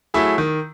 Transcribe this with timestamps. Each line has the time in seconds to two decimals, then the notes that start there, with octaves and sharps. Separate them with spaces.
0.14 F#3 A3 E4 G#4
0.38 D#3